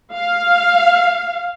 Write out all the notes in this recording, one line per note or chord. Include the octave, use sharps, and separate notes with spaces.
F5